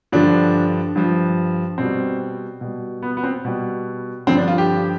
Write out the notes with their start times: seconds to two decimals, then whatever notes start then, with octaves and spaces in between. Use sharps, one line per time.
0.12 G2 D3 F3 D4
0.96 G2 F3
1.78 B2 G3 C4
2.61 B2 G3
3.03 B3
3.17 B3
3.23 C4
3.45 B2 G3
4.27 G2 D3 F3 C4
4.37 D4
4.48 F4
4.58 G4